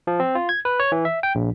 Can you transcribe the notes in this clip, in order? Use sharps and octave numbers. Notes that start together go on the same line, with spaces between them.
F3
C4
F4
G#6
B4
C#5
E3
E5
G5
A#1